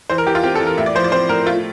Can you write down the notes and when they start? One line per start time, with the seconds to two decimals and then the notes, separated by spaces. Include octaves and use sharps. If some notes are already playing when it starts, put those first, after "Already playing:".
0.10 E3 C5
0.18 A#4
0.27 E3 G4
0.35 F4
0.44 C4 G4
0.55 A4
0.60 E3
0.67 A#4
0.78 A2 E5
0.86 D5
0.95 F3 C5
1.04 D5
1.12 C4 C5
1.29 A2 A#4
1.46 A3 F4